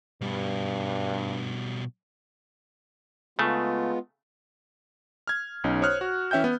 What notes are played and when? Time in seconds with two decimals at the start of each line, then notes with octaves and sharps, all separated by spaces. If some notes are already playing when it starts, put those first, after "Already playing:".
0.21 G2 B2 G3
3.39 C#3 G#3 A3 B3 F4
5.27 F6 G#6
5.64 B1 C#4 D#4
5.81 C5 C#5 D#6 F6 F#6
6.01 F#4
6.31 E3 C#4 E5 G5 G6
6.44 B3